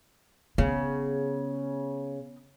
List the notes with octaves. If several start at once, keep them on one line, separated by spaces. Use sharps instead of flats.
C#3 B3